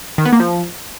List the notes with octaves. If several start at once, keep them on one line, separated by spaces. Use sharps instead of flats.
D#3
B3
A#3
F3